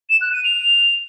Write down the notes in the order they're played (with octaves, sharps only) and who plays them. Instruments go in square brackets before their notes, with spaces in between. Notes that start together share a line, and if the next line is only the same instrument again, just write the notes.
[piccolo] E7
F#6
D#7
F7